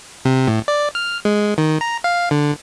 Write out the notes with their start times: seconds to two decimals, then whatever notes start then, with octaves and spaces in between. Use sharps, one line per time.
0.25 C3
0.48 A2
0.68 D5
0.95 F6
1.25 G#3
1.58 D#3
1.81 A#5
2.04 F5
2.31 D3